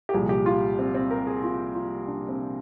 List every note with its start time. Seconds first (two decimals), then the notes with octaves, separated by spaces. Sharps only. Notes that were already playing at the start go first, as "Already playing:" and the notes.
0.09 G4
0.13 C2 A#2 F3 G#4
0.29 G4
0.46 F4
0.79 C4
0.95 C4
1.11 A#4
1.27 G#4
1.43 F4
1.74 F4
2.08 D4
2.29 C4